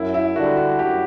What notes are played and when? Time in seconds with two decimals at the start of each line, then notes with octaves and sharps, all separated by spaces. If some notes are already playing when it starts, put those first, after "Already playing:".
Already playing: F#2 E4
0.14 E4
0.36 D3 G3 D4 F#4
0.57 F#4
0.78 F#2 G4